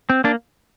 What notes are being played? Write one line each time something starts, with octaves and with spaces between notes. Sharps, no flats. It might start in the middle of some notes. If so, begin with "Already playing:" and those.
C4
A#3 D4